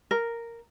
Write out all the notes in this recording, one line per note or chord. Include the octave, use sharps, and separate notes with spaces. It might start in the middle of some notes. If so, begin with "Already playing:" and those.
A#4